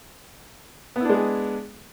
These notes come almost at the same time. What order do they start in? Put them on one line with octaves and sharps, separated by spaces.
B3 E4 D4 G#3 G#4